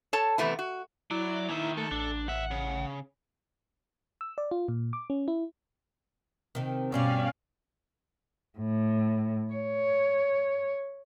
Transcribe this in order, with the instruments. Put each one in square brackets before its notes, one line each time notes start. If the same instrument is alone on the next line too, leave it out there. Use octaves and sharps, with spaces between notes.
[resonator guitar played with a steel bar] A4 C#5 A5
C3 E3 A3 B3 E4
F#4
[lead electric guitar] F#3 [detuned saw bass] E4 [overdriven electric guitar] D5
[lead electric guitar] D#2 D#3 [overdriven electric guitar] A#3 E5
[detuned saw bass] A3 [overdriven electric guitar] A4
[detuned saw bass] A1 [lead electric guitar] D4
[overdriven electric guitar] D#2 E5 [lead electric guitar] F#5
[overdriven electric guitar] C#3
[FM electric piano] E6
D5
F4
A#2
D6
C#4
E4
[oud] C3 D#3
[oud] G2 B2 G3 [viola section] C#4 D5 F5
[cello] A2
C#5